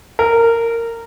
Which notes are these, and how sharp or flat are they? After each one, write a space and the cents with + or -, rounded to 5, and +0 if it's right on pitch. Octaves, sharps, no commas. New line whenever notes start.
A#4 -15